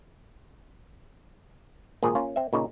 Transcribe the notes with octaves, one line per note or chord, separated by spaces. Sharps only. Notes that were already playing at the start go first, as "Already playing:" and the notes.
G#1 A#2 G#4
A#3 C#4 F4
C4 E5
A#2 C#3 D#4